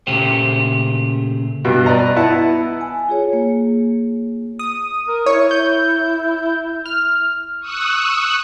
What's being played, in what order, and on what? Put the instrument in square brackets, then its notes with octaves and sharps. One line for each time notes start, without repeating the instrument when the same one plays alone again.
[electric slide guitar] A#2 C#3 A3 G4 C5
[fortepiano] G2 B2
B4 D5 D#5 A#5
B3 E4 F#5 A5
[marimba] G#5
F4 G#4 C#5
A#3
[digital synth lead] D#6
[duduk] A#4
[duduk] E4 [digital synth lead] C#5
[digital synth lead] G6
F6
[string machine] C#6 D#6 E6 F#6